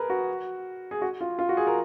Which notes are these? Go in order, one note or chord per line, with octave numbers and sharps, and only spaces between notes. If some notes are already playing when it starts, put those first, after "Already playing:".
Already playing: G#4 A#4 B4
F#4
G#4
F#4
F4
F4
F#4
G#4
A#4